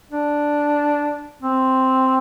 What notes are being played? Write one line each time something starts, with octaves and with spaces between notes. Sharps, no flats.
D4
C4